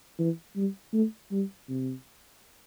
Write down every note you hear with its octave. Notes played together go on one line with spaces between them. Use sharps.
E3
G3
A3
G3
C3